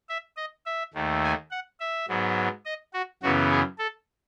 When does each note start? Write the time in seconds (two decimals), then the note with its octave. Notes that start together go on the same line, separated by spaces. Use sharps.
0.09 E5
0.37 D#5
0.66 E5
0.94 D#2 D#3 A3
1.23 G#5
1.51 F#5
1.80 E5
2.09 G#2 F#3 B3
2.65 D#5
2.93 F#4
3.22 F#2 C#3 E3 B3 F#4
3.51 G#4
3.79 A4